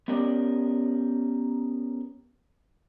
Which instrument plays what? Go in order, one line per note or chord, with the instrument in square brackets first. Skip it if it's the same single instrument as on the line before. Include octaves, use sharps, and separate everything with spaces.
[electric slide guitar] B3 C#4 G4 A#4 D5